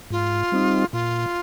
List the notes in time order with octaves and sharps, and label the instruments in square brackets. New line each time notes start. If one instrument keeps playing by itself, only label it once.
[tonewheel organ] G#2 [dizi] F4
[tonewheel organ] G3 C4 D#4
[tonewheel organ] A#2 [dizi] F4